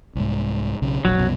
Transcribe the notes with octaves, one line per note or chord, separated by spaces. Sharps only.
C2 G#2
B1 C#3
E1 A#1 F#3
C2 F#2 B2